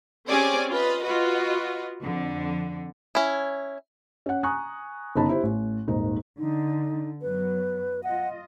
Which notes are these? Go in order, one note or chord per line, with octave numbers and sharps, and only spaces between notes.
C4 C#4 G4 G#4 D5 G#5
F4 B4 D#5
F4 F#4 B4 D#5
F2 D3
C#4 E4
C#4 F#5
G#5 A#5 C#6 D#6 F#6
G1 C#3 D#4 A5 B5
E4 G4 C5
A1
D#1 G#1 D#4
D3 D#4
F#2 F#3 B3 B4
F4 D#5 F#5